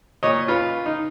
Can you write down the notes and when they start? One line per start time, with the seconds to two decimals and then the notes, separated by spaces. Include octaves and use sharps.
0.23 A#2 C#5 D#5
0.47 C#4 F4 B4
0.86 D#4